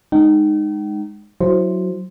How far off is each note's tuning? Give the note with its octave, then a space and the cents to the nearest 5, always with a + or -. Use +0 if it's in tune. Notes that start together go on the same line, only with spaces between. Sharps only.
G#3 +0 D#4 -15 G5 -40
F#3 +0 E4 +0 C5 +0